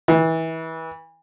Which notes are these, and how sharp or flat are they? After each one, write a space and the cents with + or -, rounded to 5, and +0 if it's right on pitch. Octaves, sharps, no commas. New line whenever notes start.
E3 -25